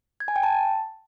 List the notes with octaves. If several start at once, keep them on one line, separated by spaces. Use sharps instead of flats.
G#6
G#5
G5
A5